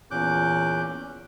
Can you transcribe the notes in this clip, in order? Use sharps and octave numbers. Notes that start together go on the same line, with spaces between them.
E2 A#2 C#4 D6 F#6 G6